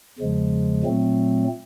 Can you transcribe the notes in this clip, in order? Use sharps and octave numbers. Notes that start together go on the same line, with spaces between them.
E2 C#3 F3 G#3
A#2 F#3 A3 C4